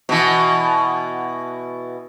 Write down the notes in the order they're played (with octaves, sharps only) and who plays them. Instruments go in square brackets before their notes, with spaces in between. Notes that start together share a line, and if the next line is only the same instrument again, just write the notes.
[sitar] B2 E3